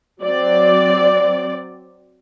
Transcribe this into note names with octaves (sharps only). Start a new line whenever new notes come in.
F#3 C4 D5